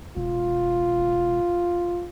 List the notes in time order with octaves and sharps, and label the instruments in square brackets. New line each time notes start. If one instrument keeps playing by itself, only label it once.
[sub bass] E1 [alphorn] F4